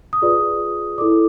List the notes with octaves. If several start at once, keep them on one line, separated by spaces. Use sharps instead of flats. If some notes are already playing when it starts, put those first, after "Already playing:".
D#6
F4 G#4 B4 D5
E4 A4 D5 D6